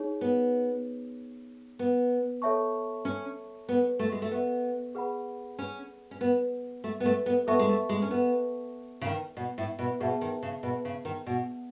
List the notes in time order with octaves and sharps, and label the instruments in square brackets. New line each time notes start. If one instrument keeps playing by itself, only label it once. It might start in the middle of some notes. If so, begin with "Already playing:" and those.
Already playing: [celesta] D#4 G#4 C#5
[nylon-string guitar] B3
B3
[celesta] A4 C#5 E5 A5 C#6
[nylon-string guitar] C#4
B3
A3
G#3
A3
B3
[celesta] G#4 B4 F#5 B5
[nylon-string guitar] C#4
C#4
B3
A3
B3
A3
B3
[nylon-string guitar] B3 [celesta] A4 E5 A5 C#6
[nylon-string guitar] G#3
A3
G#3
C#4
B3
C#3
D#3
B2
A2
B2
[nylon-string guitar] B2 [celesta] G#4 B4 E5 A5
[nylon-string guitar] D#3
C#3
B2
C#3
D#3
B2